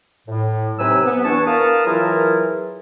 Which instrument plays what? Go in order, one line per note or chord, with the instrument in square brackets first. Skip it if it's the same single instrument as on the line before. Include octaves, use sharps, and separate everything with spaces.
[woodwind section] A2
C3 F#3 D#4 B4 G#5 E6
B3
E2 D4 G#5 A5 C#6
A#4 B4 F5 A5 D#6
E3 F#3 E4 F4 G#4 A#4